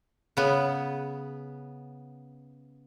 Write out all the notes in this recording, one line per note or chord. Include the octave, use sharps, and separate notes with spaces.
C#3 B3